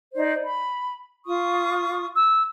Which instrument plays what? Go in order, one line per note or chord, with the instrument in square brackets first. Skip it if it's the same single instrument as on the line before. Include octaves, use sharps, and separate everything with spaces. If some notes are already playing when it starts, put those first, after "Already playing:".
[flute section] D#4 C5 D5
B5
F4 C#6 D#6
[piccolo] E6